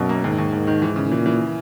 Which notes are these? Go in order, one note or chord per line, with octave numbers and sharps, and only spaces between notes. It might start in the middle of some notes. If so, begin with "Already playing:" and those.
Already playing: B1 F#2 B2
A#3
D#2 G#2
D#2
D#2
D#3
E3
C#3
A#2 E3
E3